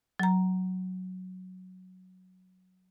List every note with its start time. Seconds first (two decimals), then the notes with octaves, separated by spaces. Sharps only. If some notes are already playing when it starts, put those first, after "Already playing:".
0.20 F#3 A#5